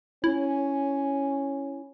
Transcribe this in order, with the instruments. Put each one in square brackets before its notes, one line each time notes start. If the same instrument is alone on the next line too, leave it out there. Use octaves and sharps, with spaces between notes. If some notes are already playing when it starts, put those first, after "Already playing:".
[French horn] C#4 [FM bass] E4